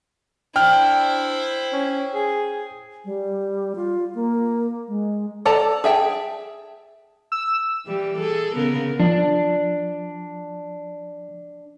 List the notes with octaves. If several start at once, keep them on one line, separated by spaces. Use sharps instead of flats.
D4 E4 C5 G5 F6
C#4
G#4
G3
F4
A#3
G#3
A4 D5 A5 A#5
G#4 E5 G5 A5
E6
E3 G3
G#4 A4
C#3 B3 A#4
F3 D4